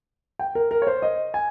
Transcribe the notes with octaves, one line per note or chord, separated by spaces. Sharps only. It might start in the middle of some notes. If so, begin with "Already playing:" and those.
G5
A#4
A#4
C#5
C5
D#5
G#5